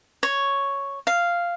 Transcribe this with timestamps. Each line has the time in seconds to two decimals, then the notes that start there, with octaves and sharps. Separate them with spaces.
0.23 C#5
1.07 F5